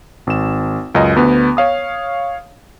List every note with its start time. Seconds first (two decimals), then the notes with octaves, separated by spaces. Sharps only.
0.27 G#1 E7
0.95 C#2 F#2 D#5
1.16 D2 B3
1.57 C#5 F5 D#6